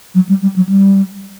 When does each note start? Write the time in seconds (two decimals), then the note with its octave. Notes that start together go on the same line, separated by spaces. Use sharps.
0.15 F#3
0.29 G3
0.42 G3
0.56 F#3
0.69 G3